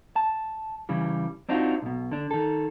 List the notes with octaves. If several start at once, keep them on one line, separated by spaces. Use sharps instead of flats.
A5
C#3 E3 G3
C4 D4 D#4 F4 F#4
B1 B2
D3 D4
D#3 A4